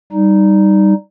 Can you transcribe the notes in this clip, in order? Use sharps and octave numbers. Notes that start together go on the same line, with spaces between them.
G3 D#4